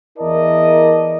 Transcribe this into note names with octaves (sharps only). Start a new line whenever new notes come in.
E2 E4 A#4 D5 D#5 A5